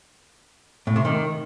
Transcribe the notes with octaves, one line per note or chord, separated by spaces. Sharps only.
A2
C3
D#3